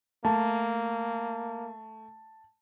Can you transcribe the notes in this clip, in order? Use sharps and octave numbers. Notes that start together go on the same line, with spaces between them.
A3 A#3 A5